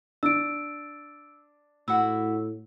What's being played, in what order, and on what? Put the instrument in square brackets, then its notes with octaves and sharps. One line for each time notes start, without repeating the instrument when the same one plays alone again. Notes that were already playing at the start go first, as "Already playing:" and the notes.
[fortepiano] D4 [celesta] E6 D7
[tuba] A2 [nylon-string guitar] E4 F#4 F#5 [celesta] E6